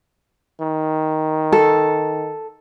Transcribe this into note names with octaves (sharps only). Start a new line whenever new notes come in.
D#3
A4